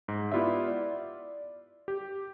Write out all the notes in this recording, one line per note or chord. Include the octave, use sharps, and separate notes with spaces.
G#2
B3 E4 F4 G4 D5 E5
D5
G4